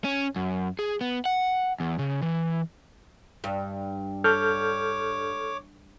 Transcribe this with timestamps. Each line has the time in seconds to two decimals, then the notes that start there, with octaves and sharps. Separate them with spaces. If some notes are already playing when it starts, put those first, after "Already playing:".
0.04 C#4
0.36 F#2
0.79 G#4
1.01 B3
1.25 F#5
1.80 E2
1.99 C#3
2.22 E3
3.44 G2
4.24 A4 C#5 D6 F6 G6